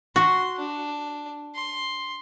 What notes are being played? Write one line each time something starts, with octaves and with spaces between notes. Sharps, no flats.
F#4 C6
D4
C6